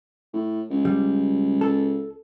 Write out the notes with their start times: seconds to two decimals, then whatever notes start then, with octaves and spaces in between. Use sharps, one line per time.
0.34 A2
0.70 C#2
0.85 G3
1.61 A4